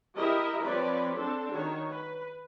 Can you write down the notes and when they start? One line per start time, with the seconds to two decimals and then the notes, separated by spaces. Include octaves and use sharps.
0.16 E4 G4 A#4 D#5 E5
0.64 F3 C4 B4 C#5 D5 B5
1.14 C4 D4 A4
1.52 D#3 F#4 C#5
1.89 B4